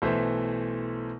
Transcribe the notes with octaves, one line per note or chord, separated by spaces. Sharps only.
B1 E3 A3 C5 E5